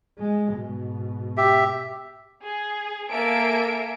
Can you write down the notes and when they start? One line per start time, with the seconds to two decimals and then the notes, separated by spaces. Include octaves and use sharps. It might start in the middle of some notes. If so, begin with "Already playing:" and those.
0.19 G#3
0.52 G#2 B2
1.37 G4 E5
2.44 G#4
3.10 A#3 A4 E5 G#5 D7